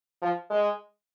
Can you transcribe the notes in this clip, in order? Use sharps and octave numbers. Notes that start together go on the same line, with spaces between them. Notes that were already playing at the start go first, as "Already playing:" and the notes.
F3
G#3